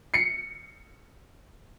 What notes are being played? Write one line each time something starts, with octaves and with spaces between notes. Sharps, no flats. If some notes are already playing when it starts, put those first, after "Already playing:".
C7 C#7